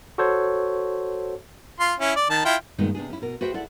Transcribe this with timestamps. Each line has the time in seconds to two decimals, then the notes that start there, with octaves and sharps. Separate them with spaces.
0.18 F#4 A4 C5 C#5
1.80 F4 C6
2.00 C#4 E4
2.16 D5
2.30 D#3 A5
2.45 E4 F4 G5
2.78 G2 A#2 D#3 G#3 B3 D#4
2.95 C3 B3 D4 G#4
3.10 C#4 E4
3.22 B2 A#4
3.41 F#4 G#4 B4 C5 E5 G5
3.54 E4 A4 D5 F#5